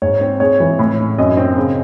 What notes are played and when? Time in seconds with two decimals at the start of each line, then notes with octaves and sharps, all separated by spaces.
0.02 G#2 C#5
0.21 C4
0.40 G#3 C#5
0.60 E3
0.79 A2
0.99 C#4
1.18 F#2 D#5
1.37 C4
1.57 C#3